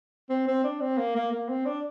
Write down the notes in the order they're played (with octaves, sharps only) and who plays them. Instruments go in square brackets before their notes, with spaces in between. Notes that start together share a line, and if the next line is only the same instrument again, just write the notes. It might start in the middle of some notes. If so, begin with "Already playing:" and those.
[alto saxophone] C4
C4
D4
C4
A#3
A#3
A#3
C4
D4